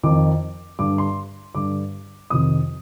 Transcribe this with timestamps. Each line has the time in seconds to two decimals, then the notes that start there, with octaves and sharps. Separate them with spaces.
0.04 F2 D#3 D6
0.79 G2 D3 D6
0.98 C6
1.55 G2 D3 D6
2.30 F2 C3 D#3 D#6